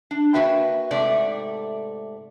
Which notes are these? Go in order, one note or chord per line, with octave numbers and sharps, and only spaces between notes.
D4
A#3 B3 F#4 B4 E5 G5
G#2 C3 A3 D5